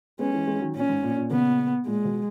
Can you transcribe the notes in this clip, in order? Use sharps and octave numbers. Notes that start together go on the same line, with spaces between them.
G#3 B3 C#4
E3 G#3
E3 G#3
D#3 F#3
A#2 C#4
G#2
A#2
A#2
A#2 C#3 B3
A#2 G#3
B2